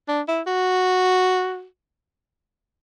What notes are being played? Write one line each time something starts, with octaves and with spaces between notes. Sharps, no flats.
D4
E4
F#4